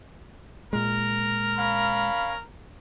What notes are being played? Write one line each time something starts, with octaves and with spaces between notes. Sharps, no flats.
A#2 G#3 A#4
C#4 F5 B5